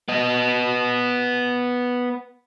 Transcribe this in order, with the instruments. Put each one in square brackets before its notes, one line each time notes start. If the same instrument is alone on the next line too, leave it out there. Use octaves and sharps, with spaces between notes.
[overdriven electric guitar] B3 D#5